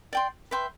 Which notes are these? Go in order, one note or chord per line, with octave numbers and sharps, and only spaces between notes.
D5 G5 C6
B4 E5 G5 C6